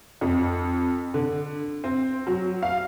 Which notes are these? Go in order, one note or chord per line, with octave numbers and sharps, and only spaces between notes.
F2
D3
C4
F#3
F5